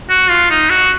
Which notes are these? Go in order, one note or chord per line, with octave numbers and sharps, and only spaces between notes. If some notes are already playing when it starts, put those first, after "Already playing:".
F#4
F4
D#4
F#4